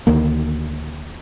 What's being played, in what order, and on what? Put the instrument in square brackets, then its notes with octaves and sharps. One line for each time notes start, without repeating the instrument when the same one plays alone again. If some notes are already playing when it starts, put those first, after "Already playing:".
[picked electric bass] D2 D#3 A#3